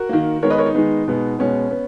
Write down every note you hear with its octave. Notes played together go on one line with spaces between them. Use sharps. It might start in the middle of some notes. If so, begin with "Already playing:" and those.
Already playing: F#4 A#4
D#3 A#3
D#3 G#3 B3 A#4 C#5
B4 D#5
A#4 C#5
D#4
D#3 G#3 B3
B2 G#3 B3
B2 G#3 B3 C#4
B3